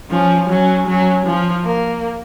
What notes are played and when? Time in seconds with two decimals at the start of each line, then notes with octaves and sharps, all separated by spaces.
0.10 F3 C#4
0.49 F#3 C#4
0.87 F#3 C#4
1.26 F3
1.64 A#3